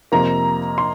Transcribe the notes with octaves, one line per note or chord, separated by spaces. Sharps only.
F2 C3 F3 A#3 A#5
C6